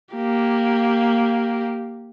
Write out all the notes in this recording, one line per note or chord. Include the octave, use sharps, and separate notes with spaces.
A#3 G4